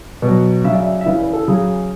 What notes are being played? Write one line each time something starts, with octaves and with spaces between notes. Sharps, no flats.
B2 F#3
C#3 F#3 E5
D5
E5
E5
C#3 E3 D5
B4
A4
C#3 F#3 G#4